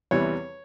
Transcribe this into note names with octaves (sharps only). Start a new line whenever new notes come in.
E2 C3 E3 G3 C#5